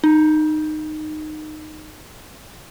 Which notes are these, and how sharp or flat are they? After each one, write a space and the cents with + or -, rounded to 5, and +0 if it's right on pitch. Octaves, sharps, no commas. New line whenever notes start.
D#4 -15